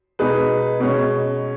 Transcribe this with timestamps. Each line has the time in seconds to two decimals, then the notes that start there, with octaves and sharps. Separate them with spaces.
0.19 B2 G#3 D#4 G#4 B4
0.80 B2 G#3 C#4